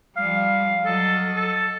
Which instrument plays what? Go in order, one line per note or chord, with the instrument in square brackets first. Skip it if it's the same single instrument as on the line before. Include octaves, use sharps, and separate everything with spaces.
[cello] F3 G3 [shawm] F5
[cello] F#3 D#5 [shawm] A4
[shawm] A4